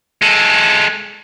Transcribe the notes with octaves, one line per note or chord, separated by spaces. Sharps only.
G#3 A4